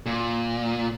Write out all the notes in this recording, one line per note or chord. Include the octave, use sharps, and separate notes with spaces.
A#2